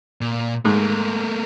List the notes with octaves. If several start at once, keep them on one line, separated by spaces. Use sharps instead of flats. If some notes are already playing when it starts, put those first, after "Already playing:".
A#2
G#2 A3 A#3